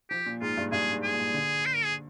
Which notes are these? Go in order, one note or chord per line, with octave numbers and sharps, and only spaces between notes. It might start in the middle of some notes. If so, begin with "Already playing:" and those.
F3 G4
A#2
G#2 F4
G2
G2 G#4
G#2
G#4
A#2
D3
C5
A#4
G#4